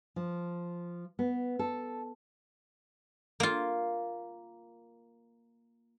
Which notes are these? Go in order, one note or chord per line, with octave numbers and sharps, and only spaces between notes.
F3
B3
A4
A#3 F4